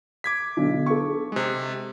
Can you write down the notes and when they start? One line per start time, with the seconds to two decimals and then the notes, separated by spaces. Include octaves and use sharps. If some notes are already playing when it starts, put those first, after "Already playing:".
0.24 D6 G#6 B6
0.57 B1 D3
0.86 A4 C#6
1.32 C3 G#3